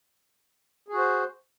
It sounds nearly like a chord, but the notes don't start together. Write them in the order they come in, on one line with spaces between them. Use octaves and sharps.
G#4 F#4 C5